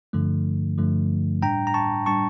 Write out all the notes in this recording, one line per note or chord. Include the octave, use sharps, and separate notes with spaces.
G2 D3 F3 A3
G2 D3 F3 A3
A2 G3 D4 G5 A#5
A#5
A5 C#6
A2 G3 D4 A5 C#6